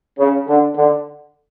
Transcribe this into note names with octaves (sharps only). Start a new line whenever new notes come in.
C#3
D3
D3